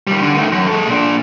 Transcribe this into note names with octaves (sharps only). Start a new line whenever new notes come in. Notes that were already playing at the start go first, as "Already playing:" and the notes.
D#3 G3
D3
D#3 A3
F#2
G#3 A4
A#2 D4